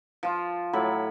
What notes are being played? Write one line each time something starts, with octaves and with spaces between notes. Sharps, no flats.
F3 F4
A2 F#3 B5